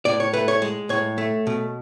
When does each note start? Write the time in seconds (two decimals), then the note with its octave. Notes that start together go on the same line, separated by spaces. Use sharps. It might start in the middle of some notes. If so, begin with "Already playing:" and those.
0.05 A2 D5
0.20 C#5
0.33 A3 B4
0.48 C#5
0.62 G#3
0.89 A2 C#5
1.18 A3
1.47 B2